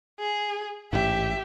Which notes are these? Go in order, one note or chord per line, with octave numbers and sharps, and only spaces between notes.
G#4
A1 G#2 G4 E5